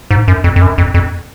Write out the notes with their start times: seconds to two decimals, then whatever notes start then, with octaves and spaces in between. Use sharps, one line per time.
0.11 G#2
0.28 F#2
0.44 F2
0.56 F2
0.62 F#2
0.78 F2
0.94 F2